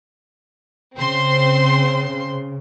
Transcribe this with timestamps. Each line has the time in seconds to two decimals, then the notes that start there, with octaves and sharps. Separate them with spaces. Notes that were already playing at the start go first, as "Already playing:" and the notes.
0.97 C#3 C4 C5 C6